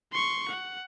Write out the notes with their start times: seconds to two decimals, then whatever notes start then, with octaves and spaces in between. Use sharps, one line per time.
0.12 C6 C#6
0.48 F#5